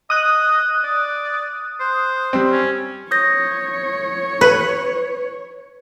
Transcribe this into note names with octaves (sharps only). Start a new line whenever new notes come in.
D#5 D#6 F#6
D5
C5
G3 C4
C#4
C#5 D#6 G6 A#6
B4